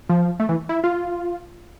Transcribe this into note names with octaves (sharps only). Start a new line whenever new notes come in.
F3
A3
E3
E4
F4